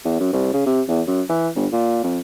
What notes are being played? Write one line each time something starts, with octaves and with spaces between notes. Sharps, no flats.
E2
F#2
C2
C#3
C3
E2
F#2
E3
G1
A#2
F2